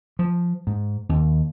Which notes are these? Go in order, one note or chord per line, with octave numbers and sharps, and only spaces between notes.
F3
G#2
D#2